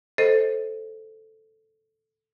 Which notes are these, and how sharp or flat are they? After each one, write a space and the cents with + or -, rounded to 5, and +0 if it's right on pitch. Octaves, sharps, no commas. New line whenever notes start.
A4 +0 C5 +0 D#5 +0